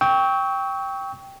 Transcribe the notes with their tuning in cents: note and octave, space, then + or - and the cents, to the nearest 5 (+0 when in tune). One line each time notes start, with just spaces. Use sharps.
G5 +0 C#6 +15 E6 -35